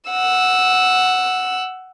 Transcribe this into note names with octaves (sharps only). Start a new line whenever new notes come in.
F#5 E6